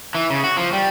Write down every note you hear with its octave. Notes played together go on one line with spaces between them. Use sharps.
E3
C#3
F#4
F3
G3